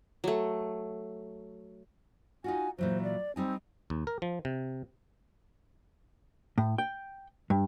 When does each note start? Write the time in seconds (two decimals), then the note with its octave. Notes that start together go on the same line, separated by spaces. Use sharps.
0.24 F#3 A3
2.44 D#4 F4 F#4 G#5
2.78 A#2 E3 F#3 C5
3.02 D5
3.36 G3 C4 D#4 G#5
3.90 D#2
4.07 A#4
4.22 F3
4.45 C3
6.58 A2
6.78 G5
7.50 G2